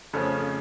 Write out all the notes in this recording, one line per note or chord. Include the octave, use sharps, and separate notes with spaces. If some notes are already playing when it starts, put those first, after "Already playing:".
F2 C#3 F3 A3 C#4